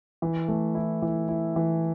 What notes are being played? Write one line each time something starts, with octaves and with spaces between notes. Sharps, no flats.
E3
A3
E4
E3
E4
E3